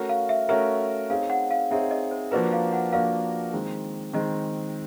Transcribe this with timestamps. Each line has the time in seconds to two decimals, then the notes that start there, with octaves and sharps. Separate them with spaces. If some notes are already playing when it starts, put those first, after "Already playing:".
Already playing: A3 C#4 F#4 A#4
0.09 F5
0.29 E5
0.49 A3 C#4 F#4 A#4 E5
1.10 C4 D#4 G#4 C#5 F5
1.30 F#5
1.51 F5
1.71 C4 D#4 G#4 C#5 E5
1.91 D#5
2.11 C5
2.31 F3 A#3 D4 F#4 A#4 B4
2.52 F5
2.73 F#5
2.92 F3 A#3 D4 F#4 A#4 F5
3.53 D#3 G#3 C4
4.13 D#3 G#3 C4 D#5